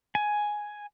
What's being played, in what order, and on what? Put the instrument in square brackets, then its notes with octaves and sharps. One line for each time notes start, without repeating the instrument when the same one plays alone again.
[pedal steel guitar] G#5